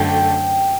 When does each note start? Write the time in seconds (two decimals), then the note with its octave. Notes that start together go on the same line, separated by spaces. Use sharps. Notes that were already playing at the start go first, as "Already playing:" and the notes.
Already playing: F#2 D3 A3 G5